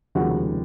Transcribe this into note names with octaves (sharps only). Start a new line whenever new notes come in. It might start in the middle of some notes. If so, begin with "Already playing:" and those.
F1 D#2 C#3 F3 G#3 F#4 F#5